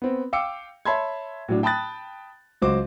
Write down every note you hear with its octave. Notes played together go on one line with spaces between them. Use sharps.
B3 C4
F5 G5 D6 E6 C#7
C#5 E5 A5 B5 C6 G#6
A2 F#3 D4
G5 A5 B5 D#6 F#6 A6
C#2 F#3 F#4 C5 D6